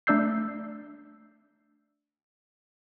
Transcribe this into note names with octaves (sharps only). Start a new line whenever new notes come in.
A3 D4 D5 E6 G6 C7